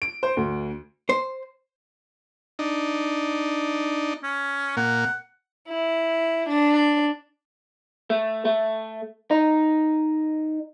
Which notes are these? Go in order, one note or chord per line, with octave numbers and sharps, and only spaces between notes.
D7
C5
D2
C5
D4 D#4
C#4
A#2 A#3 F#5
E4
D4
A3
A3
D#4